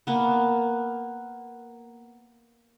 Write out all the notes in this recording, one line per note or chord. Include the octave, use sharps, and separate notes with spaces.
A#3 B3